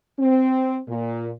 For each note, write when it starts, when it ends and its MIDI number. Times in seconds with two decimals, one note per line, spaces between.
0.18 0.79 60
0.88 1.30 46